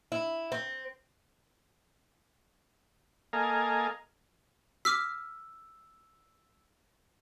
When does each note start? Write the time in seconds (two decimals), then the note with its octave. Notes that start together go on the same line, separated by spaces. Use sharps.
0.12 E4
0.52 C4
3.33 A#3 A4 D#5 F5 G#5 A#5
4.85 D6 E6 F6 B6